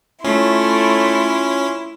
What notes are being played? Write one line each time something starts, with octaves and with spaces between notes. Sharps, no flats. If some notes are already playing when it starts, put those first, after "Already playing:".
A3 C#4 E4 F4 C#5 C6